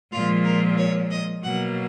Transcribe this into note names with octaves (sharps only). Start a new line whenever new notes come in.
A#2 F3 G#3 F4
A#4
C#5
D#5
B2 F#3 A#3 F#5